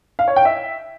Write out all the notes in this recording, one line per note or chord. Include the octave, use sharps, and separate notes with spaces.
F5
C#5
G5
E5